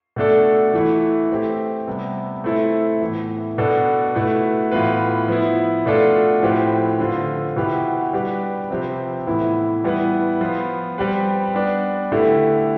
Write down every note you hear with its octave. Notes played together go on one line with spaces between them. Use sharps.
B2 A3 D4 A4
E3 A3 E4
A3 C4 G4
C3 G3 B3
A3 C4 E4 A4
A2 E3 B3
B2 B3 D4 A4
B2 A3 E4 B4
A2 E3 B3 F4 B4
F3 B3 E4
B2 A3 D4 F4 A4
A2 F3 C4 G4 B4
D3 F3 C4 F4 A4
B2 B3 E4 G4 B4
G3 D4 G4 B4
C3 F3 C4 G4 B4
A2 E3 B3 E4
E3 G3 B3 E4 B4
F3 B3 F4
G3 C4 G4 B4
G3 B3 D4
D3 A3 E4 G4